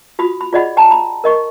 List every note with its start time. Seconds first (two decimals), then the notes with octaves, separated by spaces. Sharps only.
0.19 F4 F#4 B5 D#6
0.41 B5
0.53 F4 G#4 D5 D#5 F#5 B5
0.77 G5 A5 A#5
0.91 A#5 B5
1.24 A#4 D#5 C#6